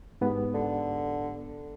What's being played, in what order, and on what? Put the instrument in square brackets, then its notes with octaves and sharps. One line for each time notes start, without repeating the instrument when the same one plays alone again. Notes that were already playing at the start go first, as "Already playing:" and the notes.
[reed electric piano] G#2 B3 G4
[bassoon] D3